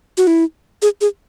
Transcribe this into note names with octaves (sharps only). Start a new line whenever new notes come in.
F#4
E4
G#4
G#4